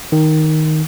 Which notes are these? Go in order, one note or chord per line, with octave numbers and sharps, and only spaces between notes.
D#3